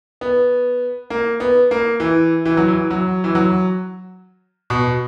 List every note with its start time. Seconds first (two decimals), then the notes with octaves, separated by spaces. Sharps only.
0.21 B3
1.10 A#3
1.40 B3
1.71 A#3
2.00 E3
2.46 E3
2.57 F#3
2.68 E3
2.91 F#3
3.24 E3
3.35 F#3
4.70 B2